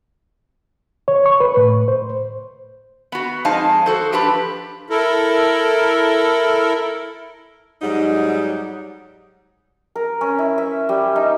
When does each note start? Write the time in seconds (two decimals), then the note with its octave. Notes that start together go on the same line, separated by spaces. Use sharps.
1.08 C#5
1.26 C#6
1.40 B4
1.57 A2
1.88 C5
3.12 B3 F#4
3.45 F2 G#3 D#4 C5 F5 A5
3.86 F#4 A4 C5
4.12 F3 D4 G4 A4 B4
4.90 E4 A4 A#4
7.82 G#2 F#3 G3 D#4
9.95 A#4
10.21 C#4
10.38 E4
10.58 E5
10.89 G3
11.16 D#4